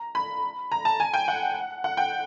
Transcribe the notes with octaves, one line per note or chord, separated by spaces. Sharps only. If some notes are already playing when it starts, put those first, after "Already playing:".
Already playing: A#5
B5
A#5
A5
G#5
G5
F#5
F#5
G5